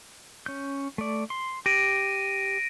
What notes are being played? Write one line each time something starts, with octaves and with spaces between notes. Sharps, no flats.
C#4 G6
A3 D5
C6
G4 A#6 D7 D#7